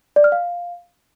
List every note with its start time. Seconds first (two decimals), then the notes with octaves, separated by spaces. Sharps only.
0.16 D5
0.24 F6
0.32 F5